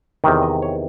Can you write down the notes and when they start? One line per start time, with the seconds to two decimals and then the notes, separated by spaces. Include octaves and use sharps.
0.24 E2 C3 D#3
0.43 D#5
0.62 C#5